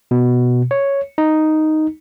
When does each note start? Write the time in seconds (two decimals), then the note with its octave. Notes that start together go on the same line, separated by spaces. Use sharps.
0.11 B2
0.71 C#5
1.18 D#4